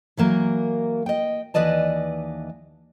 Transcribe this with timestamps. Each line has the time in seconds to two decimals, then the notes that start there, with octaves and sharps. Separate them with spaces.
0.17 E3 F#3 A#3 A#4
1.06 D#5 G5
1.54 D#2 E3 B4 D5 D#5 A5